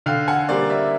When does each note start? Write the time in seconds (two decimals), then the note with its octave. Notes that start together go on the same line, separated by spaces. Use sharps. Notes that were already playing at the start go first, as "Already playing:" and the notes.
0.06 D3 F5 G5
0.28 F#5 G#5
0.49 G3 A#3 C5 D5
0.70 D5 E5